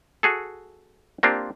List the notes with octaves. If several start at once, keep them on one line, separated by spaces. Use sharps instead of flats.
F#4 G#4 A4
A#3 C4 D4 F4 G4